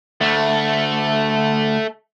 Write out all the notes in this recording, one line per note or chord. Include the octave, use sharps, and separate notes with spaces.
D2 A3